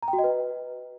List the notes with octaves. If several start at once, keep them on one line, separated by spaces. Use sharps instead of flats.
A#5
G5
F#4
D#5
B4